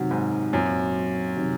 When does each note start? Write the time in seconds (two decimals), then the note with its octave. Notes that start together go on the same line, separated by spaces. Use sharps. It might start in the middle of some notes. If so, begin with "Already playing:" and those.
Already playing: F#2 C3 D#3 F#3 C4 F#4
0.11 G#2
0.53 F#2 A#2 F#3 C4 F4
1.37 C3 D#3 F#3